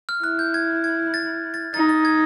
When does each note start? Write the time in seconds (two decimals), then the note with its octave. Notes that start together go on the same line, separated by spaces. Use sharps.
0.09 F6
0.24 E4 F#6
0.39 G6
0.54 G#6
0.84 G#6
1.14 A6
1.54 A6
1.74 D#4 A6
1.89 A6
2.05 G#6